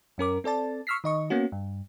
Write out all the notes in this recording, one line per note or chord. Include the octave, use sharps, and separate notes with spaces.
F#2 C#4 A#4 D6
C4 A4 D5 A5
C#6 E6 F6 B6 C7
D#3 D#5 C#6
A#3 B3 C#4 F#4
G2